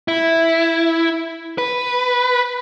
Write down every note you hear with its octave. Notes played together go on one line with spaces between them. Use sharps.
E4
B4